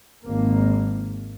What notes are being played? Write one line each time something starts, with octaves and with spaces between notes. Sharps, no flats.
G#1 A#3